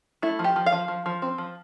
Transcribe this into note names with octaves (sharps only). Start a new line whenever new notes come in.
A3 E4
F3
G4
F3
F5
F3
F3
F3
C4
F3